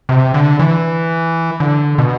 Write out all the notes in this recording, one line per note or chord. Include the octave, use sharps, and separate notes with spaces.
C3
D3
E3
D3
B2